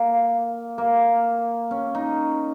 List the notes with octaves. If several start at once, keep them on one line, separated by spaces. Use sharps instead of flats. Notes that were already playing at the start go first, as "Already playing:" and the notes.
Already playing: A#3
A#3
C#4
D#4